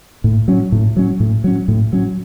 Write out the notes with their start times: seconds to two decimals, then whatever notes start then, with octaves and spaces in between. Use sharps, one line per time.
0.24 A2
0.48 F#3 C#4
0.72 A2
0.97 F#3 C#4
1.20 A2
1.44 F#3 C#4
1.68 A2
1.93 F#3 C#4